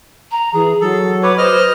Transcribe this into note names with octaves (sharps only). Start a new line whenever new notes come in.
A#5
E3 G#4
F#3 A4
B4 C#5 D6
B4 C5 D#5 F6